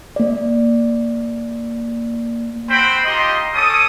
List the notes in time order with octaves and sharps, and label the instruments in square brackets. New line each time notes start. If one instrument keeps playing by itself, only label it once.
[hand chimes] A#3 D5
[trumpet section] C4 F#4 C5 G5 B5
D#4 F4 G4 D#5 C6
C#4 A4 D6 D#6